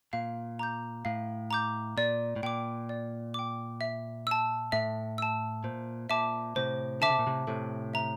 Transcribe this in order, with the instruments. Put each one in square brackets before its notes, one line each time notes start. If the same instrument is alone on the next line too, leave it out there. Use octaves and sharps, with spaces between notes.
[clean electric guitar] A#2 [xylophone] F5
[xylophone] A#5 D6 G6
[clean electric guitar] A2 [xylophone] F5
[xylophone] A#5 D6 G6
[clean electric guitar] A#2 [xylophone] D5
[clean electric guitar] A2
[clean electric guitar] A#2 [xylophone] G5 D6
[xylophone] D5
G5 D6
E5
A5 E6
[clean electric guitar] A2 [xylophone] E5
[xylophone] A5 E6
[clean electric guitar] A#2 [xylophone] C5
[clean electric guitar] A#2 [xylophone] E5 A5 D6
[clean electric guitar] A2 C3 [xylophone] C5
[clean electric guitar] D3 [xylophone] E5 A5 D6
[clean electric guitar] C3
A#2
A2 C3
[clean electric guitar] A2 C3 [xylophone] A4
[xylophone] E5 A#5